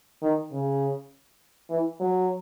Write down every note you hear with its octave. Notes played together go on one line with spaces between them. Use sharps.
D#3
C#3
E3
F#3